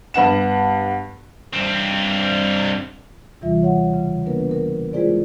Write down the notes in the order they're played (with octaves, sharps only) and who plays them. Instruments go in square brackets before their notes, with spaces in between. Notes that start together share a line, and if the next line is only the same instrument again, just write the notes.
[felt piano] G2 B3 F#5 E7
[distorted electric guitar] G2 C4
[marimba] D#2 C3 E3 G3 F4 E5
C#5 F#5
C#3
A#3 B3 D4 A#4 B4
A#4
G#3 E4 F4 G#4 C5 D5